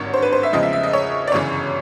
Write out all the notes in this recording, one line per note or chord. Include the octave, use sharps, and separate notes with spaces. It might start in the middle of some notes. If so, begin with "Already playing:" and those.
Already playing: G#1 G2 D3 C#5
C5
B4
C5
E5
E2 C#3 F3 G#3 D#5
E5
E5
D#5
C#5
D5
G1 F#2 C#3 E3 C#5